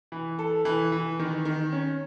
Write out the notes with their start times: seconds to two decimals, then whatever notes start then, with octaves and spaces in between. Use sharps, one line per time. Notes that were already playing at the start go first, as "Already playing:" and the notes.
0.12 E3
0.39 A4
0.65 E3
0.92 E3
1.19 D#3
1.45 D#3
1.73 C#4